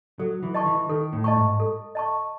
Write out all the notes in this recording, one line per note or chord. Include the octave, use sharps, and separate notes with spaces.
F#3 A4
E3
D#5 A5 C#6
E3
D#3 A4
A2
D#5 A5 C#6
G#2
A4
D#5 A5 C#6